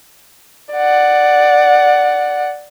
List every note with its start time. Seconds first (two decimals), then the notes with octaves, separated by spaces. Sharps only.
0.73 D5 F#5